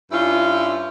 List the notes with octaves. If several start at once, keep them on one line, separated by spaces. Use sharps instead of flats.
G2 C#4 E4 F4